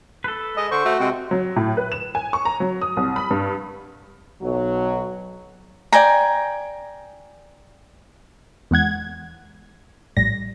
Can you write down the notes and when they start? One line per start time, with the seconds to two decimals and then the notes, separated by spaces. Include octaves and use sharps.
0.24 A4 B4
0.57 G#3 D#5
0.71 D3 C5 C#6
0.85 A3 F#4
1.00 C3 G#3 C4
1.31 F#3
1.56 A2
1.77 B4
1.92 E7
2.15 G#5
2.33 C#6
2.45 A#5
2.60 F#3
2.82 D#6
2.97 C2
3.16 B5
3.30 G2
4.41 B1 F#3
5.92 D5 G5 G#5 A#5
8.71 E2 G#3 F#5 G#6
10.17 A#1 A2 G3 A#6